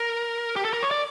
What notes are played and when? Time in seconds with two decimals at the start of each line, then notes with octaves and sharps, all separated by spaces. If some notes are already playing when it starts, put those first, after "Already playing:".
Already playing: A#4
0.56 G4
0.65 A4
0.73 A#4
0.82 C#5
0.91 D5